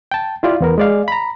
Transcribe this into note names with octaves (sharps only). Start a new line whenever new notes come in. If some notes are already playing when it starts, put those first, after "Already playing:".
G5 A5
E4 F4 G4 D5
E2 B3 A#4
G#3 D5 F5
A#5 B5